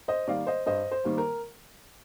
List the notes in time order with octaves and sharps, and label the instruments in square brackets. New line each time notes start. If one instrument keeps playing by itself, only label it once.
[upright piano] C5 D#5
D#3 G3 A#3 D5 F5
C5 D#5
G2 C5 D#5
C5
D#3 G3 A#3
A#4